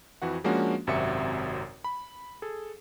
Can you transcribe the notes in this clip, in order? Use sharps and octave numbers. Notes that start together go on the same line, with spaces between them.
F2 E3 F#4 F#5
F3 G#3 A#3 C#4 D4 F#4
G#1 F#2 C3 F#4 E5 C#7
B5
G#4 A4